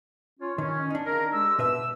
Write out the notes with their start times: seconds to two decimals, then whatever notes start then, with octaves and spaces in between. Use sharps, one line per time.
0.40 C#4 F4 C#5
0.58 D#3 C#4
0.90 D4 D#4
1.05 C#3 A#4
1.32 G#3 G4 E6
1.59 B2 B4 E5 E6